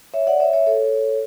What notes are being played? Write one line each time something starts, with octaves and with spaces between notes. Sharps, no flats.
C#5 E5
D5 F#5
C#5 E5
C#5 E5
A4 C#5